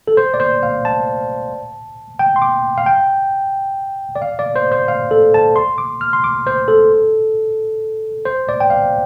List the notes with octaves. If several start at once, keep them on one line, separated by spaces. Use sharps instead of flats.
A4
C5
D5
C5
F5
A5
G5
C6
D6
F5
G5
D5
F5
D5
C5
C5
F5
A4
A5
C6
D6
F6
C6
D6
C5
A4
C5
D5
G5
F5